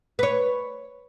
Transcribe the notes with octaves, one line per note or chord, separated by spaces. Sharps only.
B4 C#5